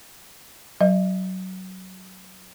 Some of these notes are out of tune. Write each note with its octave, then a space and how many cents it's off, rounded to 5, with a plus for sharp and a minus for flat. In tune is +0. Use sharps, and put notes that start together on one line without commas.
F#3 +15 D#5 -35